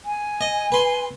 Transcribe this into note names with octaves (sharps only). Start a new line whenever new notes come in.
G#5
D#5
B4 C6